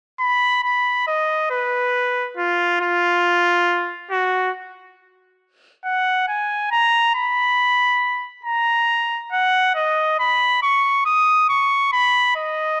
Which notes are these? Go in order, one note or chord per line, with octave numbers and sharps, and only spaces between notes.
B5
B5
D#5
B4
F4
F4
F#4
F#5
G#5
A#5
B5
A#5
F#5
D#5
B5
C#6
D#6
C#6
B5
D#5